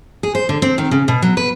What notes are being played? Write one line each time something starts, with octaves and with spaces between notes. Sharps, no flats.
G#4
C5
D3
C4
D#3
C#3
B2
F#3
B4